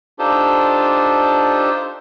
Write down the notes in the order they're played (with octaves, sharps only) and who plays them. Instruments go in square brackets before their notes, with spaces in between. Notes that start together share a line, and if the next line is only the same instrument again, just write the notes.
[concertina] D4 D#4 F4 G4 A4 C5